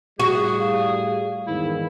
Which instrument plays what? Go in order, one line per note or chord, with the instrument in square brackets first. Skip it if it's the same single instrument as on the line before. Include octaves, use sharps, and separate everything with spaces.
[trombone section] A2 G3 [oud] F#4 [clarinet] G#4
[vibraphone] F5
[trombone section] E2 G#2 D#3 [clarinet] E4